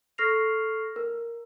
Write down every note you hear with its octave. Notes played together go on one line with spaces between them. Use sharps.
A4 C#6 F6 A#6 C7 F7
A#4